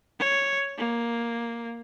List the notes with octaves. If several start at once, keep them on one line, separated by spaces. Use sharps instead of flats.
C#5
A#3